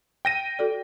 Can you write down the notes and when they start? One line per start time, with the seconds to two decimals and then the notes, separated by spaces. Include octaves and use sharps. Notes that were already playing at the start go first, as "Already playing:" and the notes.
0.25 G5 A#6 D#7
0.59 F#4 A4 D5